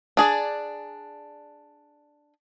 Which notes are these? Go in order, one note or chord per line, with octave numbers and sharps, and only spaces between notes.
D4 G#4 D5